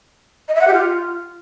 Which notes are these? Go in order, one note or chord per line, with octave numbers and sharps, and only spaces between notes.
D#5
E5
F#5
G4
F4